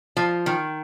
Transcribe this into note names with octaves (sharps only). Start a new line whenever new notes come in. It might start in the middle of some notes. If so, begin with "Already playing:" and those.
F3
D#3